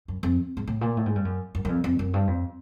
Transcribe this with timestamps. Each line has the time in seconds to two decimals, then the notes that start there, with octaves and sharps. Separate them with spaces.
0.08 F#2
0.23 F2
0.57 G#2
0.68 A2
0.81 A#2
0.97 A2
1.06 G#2
1.16 G2
1.25 F#2
1.55 F#2
1.65 F#2
1.69 F2
1.84 F2
1.99 F#2
2.14 G2
2.27 F2